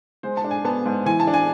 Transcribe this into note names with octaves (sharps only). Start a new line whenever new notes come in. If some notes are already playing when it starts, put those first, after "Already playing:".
G#3 C5
A5
D4
G#5
B3 A5
G#2
E3 G#5
A5
D4
G#5